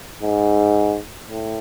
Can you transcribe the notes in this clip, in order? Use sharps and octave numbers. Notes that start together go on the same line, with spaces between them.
G#2
A2